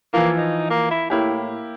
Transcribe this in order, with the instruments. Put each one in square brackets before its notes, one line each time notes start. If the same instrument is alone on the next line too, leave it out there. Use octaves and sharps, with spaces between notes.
[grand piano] E3 F3 F4 [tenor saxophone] A#3
[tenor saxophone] D#4
A#3
E4
[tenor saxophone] A2 [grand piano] A#3 E4 G4